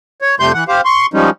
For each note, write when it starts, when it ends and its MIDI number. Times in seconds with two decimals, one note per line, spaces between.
0.22 0.35 73
0.40 0.52 41
0.40 0.52 48
0.40 0.52 55
0.40 0.52 57
0.40 0.52 84
0.40 0.52 91
0.54 0.64 52
0.54 0.64 78
0.68 0.81 67
0.68 0.81 72
0.68 0.81 77
0.85 1.06 84
0.85 1.06 85
1.14 1.30 53
1.14 1.30 55
1.14 1.30 56
1.14 1.30 61
1.14 1.30 63